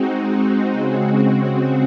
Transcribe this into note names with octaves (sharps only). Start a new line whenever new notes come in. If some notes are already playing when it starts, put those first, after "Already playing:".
Already playing: G#3 C4 D#4 F#4
C#3 G#3 C4 F#4